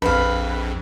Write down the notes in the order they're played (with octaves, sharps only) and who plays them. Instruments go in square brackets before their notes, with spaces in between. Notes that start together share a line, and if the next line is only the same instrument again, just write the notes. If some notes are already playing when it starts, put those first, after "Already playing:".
[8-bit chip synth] A#1 F2 [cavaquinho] B4 F5